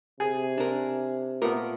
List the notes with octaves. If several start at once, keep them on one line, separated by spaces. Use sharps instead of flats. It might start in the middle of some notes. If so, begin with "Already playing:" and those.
C3 G#4
D4 A#4
A#2 A3 B3 A#4